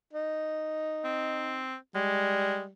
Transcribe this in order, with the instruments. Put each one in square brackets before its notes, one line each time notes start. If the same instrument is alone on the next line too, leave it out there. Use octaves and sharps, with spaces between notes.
[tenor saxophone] D#4
[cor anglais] C4
[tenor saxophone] G3 [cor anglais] G#3